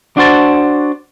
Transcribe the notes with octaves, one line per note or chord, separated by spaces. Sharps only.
D4 F#4 C5 A5